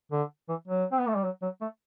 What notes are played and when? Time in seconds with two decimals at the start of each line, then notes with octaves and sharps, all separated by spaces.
0.11 D3
0.49 E3
0.67 F#3
0.92 C4
1.00 B3
1.07 A3
1.16 G3
1.24 F#3
1.42 F#3
1.61 A3